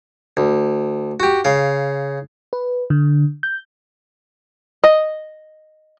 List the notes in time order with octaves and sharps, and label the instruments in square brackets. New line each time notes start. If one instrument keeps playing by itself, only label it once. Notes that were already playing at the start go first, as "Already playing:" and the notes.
[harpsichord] D2
F#4 G4
C#3 F5
[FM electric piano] B4
D3
G6
[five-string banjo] D#5